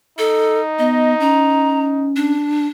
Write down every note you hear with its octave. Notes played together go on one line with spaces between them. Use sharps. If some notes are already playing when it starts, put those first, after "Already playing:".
D#4 A4
B3 D#5
C#4 A#5
D4